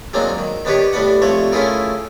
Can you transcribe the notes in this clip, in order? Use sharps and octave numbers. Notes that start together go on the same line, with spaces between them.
F#3 G#3 A#3 C4 D4 D#4
D#3
D#3 B3 D4 G4 B4 C#5
A2 G3 B3 D4 F#5
C2 F3 A3 C#5 F#5
A3 C#4 E4 F4 G#4 A#4